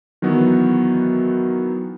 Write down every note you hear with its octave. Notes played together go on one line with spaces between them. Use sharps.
D#3 E3 F#3 B3 F#4